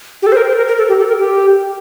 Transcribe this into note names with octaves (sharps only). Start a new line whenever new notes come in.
G4
A4
C5
A#4
C5
A#4
A#4
A4
G4
A4
A#4
G4